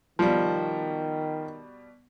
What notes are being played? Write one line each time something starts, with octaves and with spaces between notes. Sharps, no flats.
B2 D#3 F3 G3